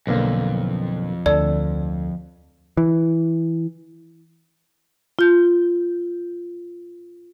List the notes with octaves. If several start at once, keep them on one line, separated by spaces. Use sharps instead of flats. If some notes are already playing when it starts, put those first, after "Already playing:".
B1 F2 D3 A#3
D2 A4 D5
E3
F4 G6